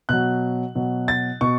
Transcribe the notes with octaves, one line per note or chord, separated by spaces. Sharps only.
B2 F#3 F#6
B2 F#3
A6
B2 C#6